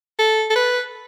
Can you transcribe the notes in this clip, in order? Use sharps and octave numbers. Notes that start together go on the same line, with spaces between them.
A4
A4
B4